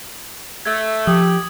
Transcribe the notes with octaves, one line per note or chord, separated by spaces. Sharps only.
A3 G#6
F3 G4 D#6